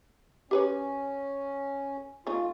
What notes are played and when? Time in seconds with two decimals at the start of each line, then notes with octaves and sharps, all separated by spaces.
0.51 C#4 G4 B4 C#5
2.27 A3 C#4 D#4 F4